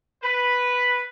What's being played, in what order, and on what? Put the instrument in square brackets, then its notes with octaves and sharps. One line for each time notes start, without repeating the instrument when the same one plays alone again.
[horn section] B4